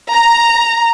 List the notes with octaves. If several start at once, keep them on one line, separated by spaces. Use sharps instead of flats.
A#5